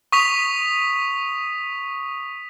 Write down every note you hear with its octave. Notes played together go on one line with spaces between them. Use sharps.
C#6 D#6 B6 F7